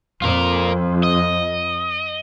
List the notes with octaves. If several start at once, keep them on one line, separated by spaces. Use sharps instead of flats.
F2 F4 A#4
D#5